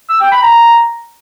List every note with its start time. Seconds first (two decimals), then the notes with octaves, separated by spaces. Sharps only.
0.09 E6
0.20 G5
0.32 B5
0.43 A#5